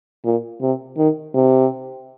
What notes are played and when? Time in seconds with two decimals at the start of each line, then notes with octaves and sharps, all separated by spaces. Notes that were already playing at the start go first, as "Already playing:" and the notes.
0.24 A#2
0.61 C3
0.97 D#3
1.34 C3